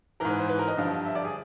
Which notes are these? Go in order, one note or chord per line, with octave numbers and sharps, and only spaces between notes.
G#2 E3 A#4
B4
C5
B4
A#4
D#5
G2 D3 F3
E5
D5
G#4